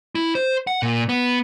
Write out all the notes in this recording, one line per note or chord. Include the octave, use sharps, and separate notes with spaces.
E4
C5
F#5
A#2
B3